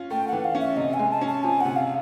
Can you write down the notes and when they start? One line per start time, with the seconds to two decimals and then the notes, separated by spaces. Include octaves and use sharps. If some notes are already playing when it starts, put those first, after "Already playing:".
Already playing: C#4 F4
0.11 A3 G5
0.28 E3 F#5
0.44 F5
0.55 C#4
0.60 E5
0.77 C3 D#5
0.94 G#5
0.99 G#3
1.11 A5
1.21 C#4
1.27 A5
1.43 F3 G#5
1.61 C3 F#5
1.76 F5